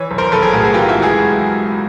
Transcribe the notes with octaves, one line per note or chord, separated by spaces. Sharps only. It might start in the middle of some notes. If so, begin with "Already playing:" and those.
Already playing: E3 C#5
B1
A#4 C5
B1 A4 B4
G#4 A#4
A2 F#4 G#4
F#4 G#4
E3 F4 G4
E4 F#4
C#2
F#4 G#4